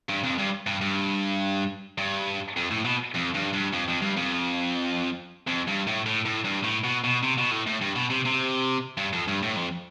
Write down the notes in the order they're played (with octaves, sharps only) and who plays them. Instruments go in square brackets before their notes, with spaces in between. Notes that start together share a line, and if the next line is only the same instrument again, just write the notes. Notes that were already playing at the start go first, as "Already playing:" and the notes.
[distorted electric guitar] G2
F2
G2
G2
G2
G2
F2
A2
B2
F2
G2
G2
F2
F2
G2
F2
F2
G2
A2
A2
A2
G2
A2
B2
B2
C3
B2
A2
A2
G2
B2
C3
C3
G2
F2
G2
A2
F2